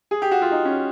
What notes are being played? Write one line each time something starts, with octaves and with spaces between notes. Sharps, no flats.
G#4
G4
F#4
F4
D#4
C#4